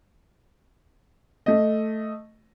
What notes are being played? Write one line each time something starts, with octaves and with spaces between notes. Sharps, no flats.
A3 D#5